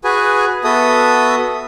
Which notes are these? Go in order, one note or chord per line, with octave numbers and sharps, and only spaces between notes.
F#4 G#4 B4 G#5
B3 F#4 A4 E5 D#6